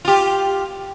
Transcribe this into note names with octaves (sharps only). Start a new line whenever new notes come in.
F4 G4